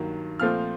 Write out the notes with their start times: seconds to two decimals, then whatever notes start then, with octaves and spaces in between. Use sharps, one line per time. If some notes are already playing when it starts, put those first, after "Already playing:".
Already playing: G2 D#3 F#3 A#3
0.40 A#2 F3 A3 C4 F6